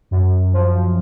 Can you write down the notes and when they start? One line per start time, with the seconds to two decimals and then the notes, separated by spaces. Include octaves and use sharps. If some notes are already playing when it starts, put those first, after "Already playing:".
0.11 F#2
0.53 F3